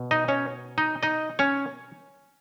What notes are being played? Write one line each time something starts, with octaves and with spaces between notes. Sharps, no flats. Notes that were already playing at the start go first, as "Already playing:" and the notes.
Already playing: B2
D#4 D#5
C#4 C#5
D#4 D#5
D#4 D#5
C#4 C#5